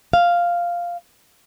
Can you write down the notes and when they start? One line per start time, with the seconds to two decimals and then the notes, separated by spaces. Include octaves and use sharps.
0.13 F5